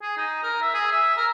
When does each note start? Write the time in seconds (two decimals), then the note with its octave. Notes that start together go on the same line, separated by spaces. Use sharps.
0.02 G#4
0.17 D#4
0.43 A#4
0.62 E5
0.74 G#4
0.92 E5
1.17 A#4